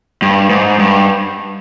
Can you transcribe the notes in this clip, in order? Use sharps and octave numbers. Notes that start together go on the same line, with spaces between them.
G2
G#2
G2